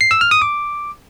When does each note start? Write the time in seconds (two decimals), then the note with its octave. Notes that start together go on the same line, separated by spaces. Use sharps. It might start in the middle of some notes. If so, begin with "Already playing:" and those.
0.01 C7
0.11 E6
0.21 F6
0.31 D#6
0.42 D6